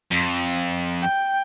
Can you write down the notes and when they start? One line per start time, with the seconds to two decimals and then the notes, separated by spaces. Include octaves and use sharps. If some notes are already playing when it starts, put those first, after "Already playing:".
0.11 F2
1.02 G5